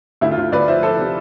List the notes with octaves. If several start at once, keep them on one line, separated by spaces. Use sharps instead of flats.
D2 E4
F4
D2
D2 B4 D5
F3 C5 E5
F3 A4 C5
C3